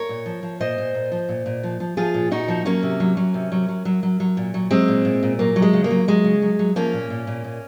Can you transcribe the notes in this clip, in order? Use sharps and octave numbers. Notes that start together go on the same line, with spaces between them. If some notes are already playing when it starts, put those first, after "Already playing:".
Already playing: A#4 C#5
A#2
F3
F3
A#2 C5 D#5
A#2
A#2
F3
A#2
A#2
F3
F3
F3 F4 G#4
A#2
A#2 D#4 F#4
F3
F#3 A#3 C#4
C3
F#3
F#3
C3
F#3
F#3
F#3
F#3
F#3
A#2
F#3
F#3 G#3 C4
A#2
A#2
A#2
F#3 A#3
F#3
G#3
C#3
A#3
F#3
F#3 G#3
C#3
F#3
F#3
F3 A#3 C#4
A#2
A#2
A#2
A#2